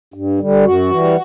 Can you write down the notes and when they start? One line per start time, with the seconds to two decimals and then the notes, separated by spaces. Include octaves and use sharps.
0.14 G2
0.39 D3 G3
0.65 F#2 F#4
0.91 E3 G3